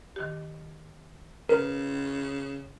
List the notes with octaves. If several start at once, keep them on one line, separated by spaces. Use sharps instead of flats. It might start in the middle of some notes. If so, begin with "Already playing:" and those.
D#3 G4
C#3 A#4 B4